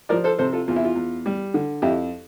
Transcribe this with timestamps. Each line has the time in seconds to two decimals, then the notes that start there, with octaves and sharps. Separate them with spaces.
0.09 F3 A#4 D5
0.24 A4 C5
0.39 C3 A4 C5
0.53 F4 A4
0.68 E2 F4
0.76 E4
0.85 F4
0.96 E2
1.26 G3
1.54 D3
1.82 F2 E4 G4